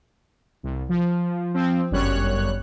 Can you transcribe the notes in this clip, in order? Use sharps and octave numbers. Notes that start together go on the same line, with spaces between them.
C2
F3
F3 C4
G1 F#2 G3 C#5 F#6